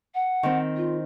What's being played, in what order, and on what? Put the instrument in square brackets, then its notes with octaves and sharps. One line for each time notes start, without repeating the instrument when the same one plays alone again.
[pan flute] F#5
[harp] D#3 C4
[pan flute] F4